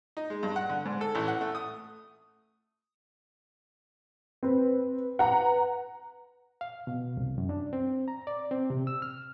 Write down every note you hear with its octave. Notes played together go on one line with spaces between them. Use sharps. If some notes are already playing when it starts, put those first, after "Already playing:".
D#4
G#3
G2
F#5
D3
G#2
A4
A1
F#5
A3
D#6
C4 B4
B4 F#5 A#5
F5
B2
C2
F#2
D4
C4
A#5
D5
C4
C3
E6
F6